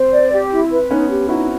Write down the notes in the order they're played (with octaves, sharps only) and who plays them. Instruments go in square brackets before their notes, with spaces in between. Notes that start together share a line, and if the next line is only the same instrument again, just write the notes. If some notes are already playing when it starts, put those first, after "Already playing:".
Already playing: [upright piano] C4 [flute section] C5
[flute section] D5
G4
E4
B4
[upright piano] B3 C#4 [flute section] D#4
[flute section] G4
[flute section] D#4 [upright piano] E4 F#4